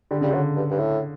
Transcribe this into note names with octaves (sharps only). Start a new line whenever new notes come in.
D3 G3
C#3 G3
D3 F#3
G2
G2
A2